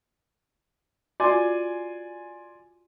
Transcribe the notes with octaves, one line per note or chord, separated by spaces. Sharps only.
F4 F#4 D5 G#5 C6